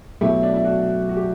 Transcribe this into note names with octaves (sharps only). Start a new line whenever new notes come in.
B2 F#3 A3 E4 G4
D4
E4
D4 F#4
F#4
G4